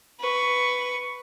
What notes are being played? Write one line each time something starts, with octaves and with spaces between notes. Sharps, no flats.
B4 C#6